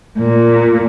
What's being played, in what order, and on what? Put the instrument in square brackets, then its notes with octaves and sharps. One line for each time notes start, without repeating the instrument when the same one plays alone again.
[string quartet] A#2